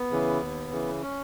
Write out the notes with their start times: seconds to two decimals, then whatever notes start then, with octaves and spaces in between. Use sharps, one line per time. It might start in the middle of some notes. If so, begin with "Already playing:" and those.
Already playing: B3
0.12 C#3 E3
0.41 D#2
0.72 C#3 E3
1.02 C#4